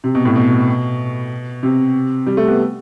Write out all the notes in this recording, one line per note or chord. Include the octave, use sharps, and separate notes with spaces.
C3
B2
A2
B2
C3
G3
A3
B3